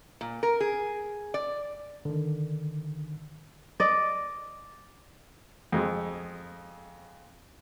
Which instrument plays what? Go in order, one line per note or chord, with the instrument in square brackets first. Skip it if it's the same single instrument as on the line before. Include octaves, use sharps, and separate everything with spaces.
[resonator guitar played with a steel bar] A#2
A#4
G#4
D5
[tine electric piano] D3 D#3
[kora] D5 D#5
[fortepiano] F2 G#3